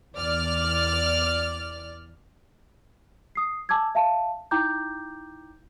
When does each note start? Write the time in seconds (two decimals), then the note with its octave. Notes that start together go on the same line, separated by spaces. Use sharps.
0.16 E2 D5 F6
3.35 D#6 C7
3.69 G#5 A5 D6 E6 G#6
3.95 E5 F5 A5
4.51 D#4 E4 G5 A#5 D6 G6